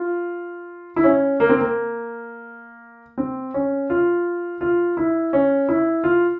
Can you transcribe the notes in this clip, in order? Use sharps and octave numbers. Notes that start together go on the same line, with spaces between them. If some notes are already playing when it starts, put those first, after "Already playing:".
Already playing: F4
E4
C#4
A#3
C4
A#3
C4
C#4
F4
F4
E4
C#4
E4
F4